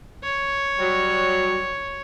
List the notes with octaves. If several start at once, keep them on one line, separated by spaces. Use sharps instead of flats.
C#5
F#3 G3